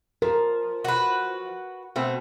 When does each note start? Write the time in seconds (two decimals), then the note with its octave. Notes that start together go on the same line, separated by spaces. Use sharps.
0.22 F3 A#4
0.85 F#4 B4
1.96 B2 A3 C4